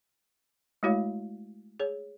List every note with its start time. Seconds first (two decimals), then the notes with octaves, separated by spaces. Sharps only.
0.83 G#3 A3 E4 F#4 C#5 F5
1.80 G#4 C#5